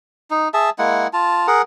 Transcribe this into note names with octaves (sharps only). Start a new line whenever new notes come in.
D#4
G#4 E5 A5
G#3 A#3 E4 F#5
F4 A5
G#4 A#4 F#5